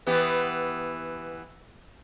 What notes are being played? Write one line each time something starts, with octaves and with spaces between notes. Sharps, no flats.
E3 B3 G4